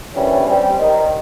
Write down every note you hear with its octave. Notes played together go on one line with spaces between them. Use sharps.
A#1 D#2 D3 E3 G3 C#4
G3 C4
D#3